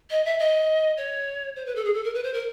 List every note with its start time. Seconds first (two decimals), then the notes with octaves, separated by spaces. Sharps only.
0.10 D#5
0.25 E5
0.39 D#5
0.97 C#5
1.56 C5
1.66 B4
1.75 A4
1.84 G#4
1.94 A4
2.04 A#4
2.14 B4
2.23 C5
2.33 A#4